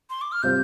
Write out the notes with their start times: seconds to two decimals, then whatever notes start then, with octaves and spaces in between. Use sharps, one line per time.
0.10 C6
0.21 D6
0.32 F6
0.43 C3 G3 F4 C5 G6